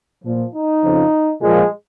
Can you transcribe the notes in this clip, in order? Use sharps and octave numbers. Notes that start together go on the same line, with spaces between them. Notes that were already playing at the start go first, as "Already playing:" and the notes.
A#2 F3
D#4
F2 C#3 F3
A#2 F3 G#3